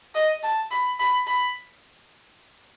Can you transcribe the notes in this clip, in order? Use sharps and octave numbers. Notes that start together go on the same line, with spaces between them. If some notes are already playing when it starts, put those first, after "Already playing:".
D#5
A5
B5
B5
B5